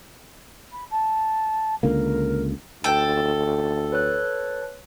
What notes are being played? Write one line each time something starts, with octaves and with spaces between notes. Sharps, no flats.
B5
A5
C#2 D3 A#3 A#4
D2 A4 G5
B4 C#5 F#6